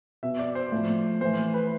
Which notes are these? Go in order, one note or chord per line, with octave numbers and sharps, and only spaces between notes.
B2 E5
D5
C5
A2 F3
A2 E3 C5
B4